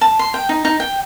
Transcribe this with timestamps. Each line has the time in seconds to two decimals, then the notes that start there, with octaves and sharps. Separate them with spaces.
0.01 A5
0.19 C6
0.34 G5
0.49 D#4
0.65 D#4
0.80 G5